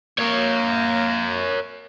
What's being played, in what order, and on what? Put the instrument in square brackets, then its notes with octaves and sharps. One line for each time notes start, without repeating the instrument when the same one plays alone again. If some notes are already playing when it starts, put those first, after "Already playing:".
[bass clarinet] A#3 [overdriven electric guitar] A#4 C#5